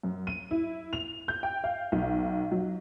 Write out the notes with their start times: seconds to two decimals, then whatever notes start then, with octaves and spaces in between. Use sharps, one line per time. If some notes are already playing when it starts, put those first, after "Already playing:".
0.03 F#2
0.27 D#7
0.51 E4
0.93 F7
1.28 G6
1.43 G5
1.64 F5
1.92 B1
2.52 F#3